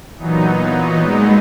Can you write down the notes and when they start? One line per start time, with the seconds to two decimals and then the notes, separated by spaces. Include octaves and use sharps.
0.18 A#2 E3 F#3 B3 D#4
0.63 E3
1.07 G#3